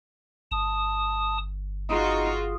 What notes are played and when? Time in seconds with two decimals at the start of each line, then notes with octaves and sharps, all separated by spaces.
0.51 G1 A5 D#6
1.90 D#4 F4 F#4 G#4